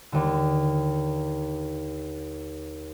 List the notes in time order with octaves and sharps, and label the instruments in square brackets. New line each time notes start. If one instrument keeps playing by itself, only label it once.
[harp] D#2 D3